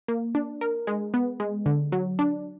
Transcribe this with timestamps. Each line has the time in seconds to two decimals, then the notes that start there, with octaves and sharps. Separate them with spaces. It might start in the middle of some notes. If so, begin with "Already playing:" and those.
0.08 A#3
0.35 D4
0.61 A#4
0.87 G#3
1.14 B3
1.40 G#3
1.66 D3
1.92 F#3
2.19 D4